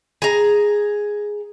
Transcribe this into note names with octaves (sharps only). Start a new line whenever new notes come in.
G#4 A#5